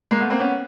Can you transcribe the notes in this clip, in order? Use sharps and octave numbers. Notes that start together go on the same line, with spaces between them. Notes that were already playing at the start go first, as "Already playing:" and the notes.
G#3 A#3
A3 B3
A#3 C4
B3 C#4